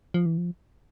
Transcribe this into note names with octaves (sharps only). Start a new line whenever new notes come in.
F3
E3
F3